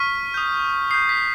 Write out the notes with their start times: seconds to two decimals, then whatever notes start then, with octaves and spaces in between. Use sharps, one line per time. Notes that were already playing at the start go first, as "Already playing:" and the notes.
Already playing: C#6 F6 B6
0.34 D#6 G6
0.91 D#6 G6 C7
1.09 B6